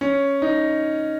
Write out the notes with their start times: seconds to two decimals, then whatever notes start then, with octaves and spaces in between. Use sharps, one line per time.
0.01 C#4
0.42 D#4